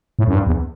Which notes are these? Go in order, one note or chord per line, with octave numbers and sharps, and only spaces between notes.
A2
F#2
G2
E2